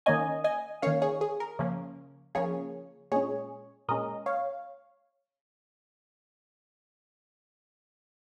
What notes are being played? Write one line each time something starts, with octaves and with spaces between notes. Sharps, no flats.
D#3 A#3 C#4 D#5 G#5
D#5 G#5
D#3 A#3 C#4 C#5 F5
G#4 C#5
G#4
A#4
C#3 F3 A#3 C#4
C#3 F3 A#3 C#4 G#4 C#5
A#2 G#3 C#4 G#4 C#5
A#2 G#3 C#4 A#4 D#5
C#5 F5